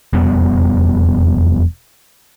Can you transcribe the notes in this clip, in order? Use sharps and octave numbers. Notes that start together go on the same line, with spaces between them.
E1 F2 G3 B3